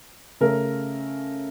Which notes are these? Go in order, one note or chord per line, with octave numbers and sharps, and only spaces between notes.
C#3 A3 A#4